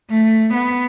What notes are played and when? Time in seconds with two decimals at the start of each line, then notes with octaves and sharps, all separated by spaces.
0.10 A3
0.54 B3